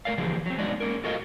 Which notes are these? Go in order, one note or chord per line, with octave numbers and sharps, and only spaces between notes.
A3 A#4 D5 F5
D3 E3 F3 A#3 G4 G#4
F#3 C4
G#3 B3 D4 D#4 F#4 D5
A#3 C#4 A#4
F4 F#4 A4 A#4 D#5 F5